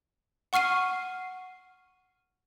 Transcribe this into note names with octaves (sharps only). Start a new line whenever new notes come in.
F#5 C#6 F6 C7 D#7